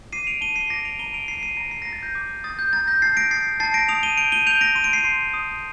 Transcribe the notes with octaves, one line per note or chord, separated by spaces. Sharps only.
D6 C7 D#7
D7 F7
A5 D#7 G7
C7 D#7
D6 A#6 D7
D7 F7
A#5 D#7 G7
D7 F7
A#5 C7 D#7
C7 D#7
A#5 A#6 D7
C7
A#5 A#6
A6
G6 A#6
D6
D#6 A6
G6
A#5 A6
G6 A#6
A5 A6 C7
A#6 D7
D#6 A6 C7
A5 A6 C7
A#6 D7
D#6 D7 F7
D#7 G7
G6 D7 F7
D#7 G7
G6 D7 F7
A#6 D7
C6 D#7
D7
C7 D#7
C6
D#6